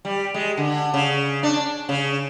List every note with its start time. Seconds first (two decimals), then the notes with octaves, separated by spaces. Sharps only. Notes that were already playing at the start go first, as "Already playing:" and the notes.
0.05 G3
0.34 G#3
0.57 D3
0.94 C#3
1.43 D4
1.89 C#3